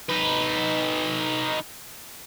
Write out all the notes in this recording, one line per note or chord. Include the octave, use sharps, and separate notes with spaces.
D#4 B4